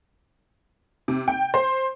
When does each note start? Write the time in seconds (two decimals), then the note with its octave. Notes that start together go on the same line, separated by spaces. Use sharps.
1.08 C3
1.28 G5
1.54 C5